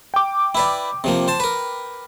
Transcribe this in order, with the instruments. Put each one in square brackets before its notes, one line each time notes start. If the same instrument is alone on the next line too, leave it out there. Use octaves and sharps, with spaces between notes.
[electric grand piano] G5 D6
[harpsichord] E4 B4 D5
C3 F3 A#3
C5 A5
A#4 B4